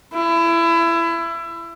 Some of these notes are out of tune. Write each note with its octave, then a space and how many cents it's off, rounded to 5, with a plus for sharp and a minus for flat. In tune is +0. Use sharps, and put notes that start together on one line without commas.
E4 +25